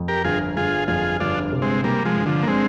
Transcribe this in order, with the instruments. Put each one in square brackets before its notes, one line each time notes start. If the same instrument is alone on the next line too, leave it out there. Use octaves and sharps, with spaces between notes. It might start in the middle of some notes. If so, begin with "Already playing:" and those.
Already playing: [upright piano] F2
[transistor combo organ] G4 A#4
[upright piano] G1 [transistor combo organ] F4 G#4
[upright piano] G1 [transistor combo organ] F4 G#4
[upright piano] F2 [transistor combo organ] F4 G#4
[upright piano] G1 [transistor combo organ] D4 F4
[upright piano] C3
[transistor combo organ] G#3 C4
[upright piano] C3 [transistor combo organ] G3 A#3
[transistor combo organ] F3 G#3
[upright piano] G1
[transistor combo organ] D3 F3
A#3
[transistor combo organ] G#3 C4 [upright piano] D4